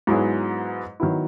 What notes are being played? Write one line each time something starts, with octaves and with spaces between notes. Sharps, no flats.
G#2 F#3 B3 E4 G#4
D#3 F#3 B3 E4